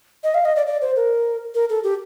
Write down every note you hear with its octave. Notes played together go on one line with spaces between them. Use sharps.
D#5
F5
D#5
D5
D5
C5
A#4
A#4
A4
G4